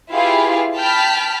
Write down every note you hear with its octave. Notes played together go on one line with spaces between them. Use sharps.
E4 F4 G4 G#4 B4 F5
G5 A5 B5 F6 B6